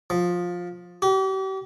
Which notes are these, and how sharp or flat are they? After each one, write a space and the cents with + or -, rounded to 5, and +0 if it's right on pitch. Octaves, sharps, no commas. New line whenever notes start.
F3 +15
G4 -40